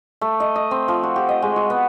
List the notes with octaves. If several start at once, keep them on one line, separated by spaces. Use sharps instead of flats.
A3
D#5
D#5
C4
F3
F#4
G4
D#5
G#3
F#4
B3